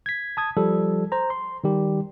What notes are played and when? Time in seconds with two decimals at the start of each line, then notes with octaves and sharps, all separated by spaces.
0.06 G#6 B6
0.37 A5 D#6 G#6
0.57 F3 G3 A4
1.12 C5 A#5
1.30 C6
1.64 D#3 G3 G4